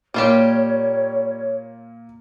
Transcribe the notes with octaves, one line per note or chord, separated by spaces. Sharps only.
A#2 G3 A#3 F4 G4 C#5 E7